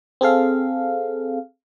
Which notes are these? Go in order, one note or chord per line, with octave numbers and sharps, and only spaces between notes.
C4 G#4 A4 F5